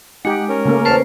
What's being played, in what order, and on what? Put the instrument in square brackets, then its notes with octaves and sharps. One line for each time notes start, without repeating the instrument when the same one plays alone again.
[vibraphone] G#3 [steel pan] D#4 G4 [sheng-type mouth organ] F#5
[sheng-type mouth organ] C#4 A#4
[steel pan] C#3 A3 A#3
[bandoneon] E2 A5 F6 [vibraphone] B4 C5